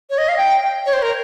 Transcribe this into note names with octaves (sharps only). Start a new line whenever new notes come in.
C#5
D#5
F5
G5
C#5
C5
A#4